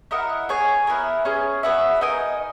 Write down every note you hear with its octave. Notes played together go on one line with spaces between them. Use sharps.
E4 A#4 D#5 F#5
G#4 C#5 G#5
B3 E4 A#4
C#4 G#4 C#5
B3 F#4 B4 E5
D#4 A#4 D#5 G#5